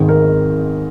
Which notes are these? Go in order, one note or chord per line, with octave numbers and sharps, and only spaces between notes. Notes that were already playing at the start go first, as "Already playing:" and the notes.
Already playing: G#1 G#2 D#3
A#4